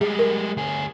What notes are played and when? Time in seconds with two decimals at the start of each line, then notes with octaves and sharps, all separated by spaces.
0.01 G3 G#3 G#4
0.19 A#4
0.57 D2 G#4